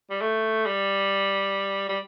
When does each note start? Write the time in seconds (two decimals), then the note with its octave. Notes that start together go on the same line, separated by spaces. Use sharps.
0.10 G3
0.21 A3
0.66 G3
1.89 G3